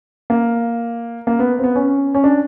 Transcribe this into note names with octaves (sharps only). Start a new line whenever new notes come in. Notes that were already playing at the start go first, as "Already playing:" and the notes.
A#3
A#3
B3
C4
B3
C#4
C#4
D4